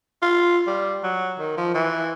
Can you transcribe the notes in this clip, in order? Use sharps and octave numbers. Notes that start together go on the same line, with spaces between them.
F4
G3
F#3
D#3
F3
E3